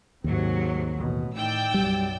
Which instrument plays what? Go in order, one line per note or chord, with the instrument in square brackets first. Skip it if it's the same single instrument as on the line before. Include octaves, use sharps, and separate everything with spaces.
[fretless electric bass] D#2 [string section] G#2 F#3 [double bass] C3
[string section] A1 [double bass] B2
[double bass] A2 D#3 [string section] D5 G5 E6
[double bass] B1 F#2 [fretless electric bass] G3